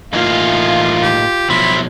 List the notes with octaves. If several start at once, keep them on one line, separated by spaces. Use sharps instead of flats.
A2 E3 A#3 D#4 F4 F5
G4
B2 F3 F#3 C4 E4 B5